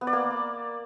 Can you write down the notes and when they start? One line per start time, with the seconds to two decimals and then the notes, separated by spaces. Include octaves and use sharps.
0.01 B3
0.07 D5
0.13 A#3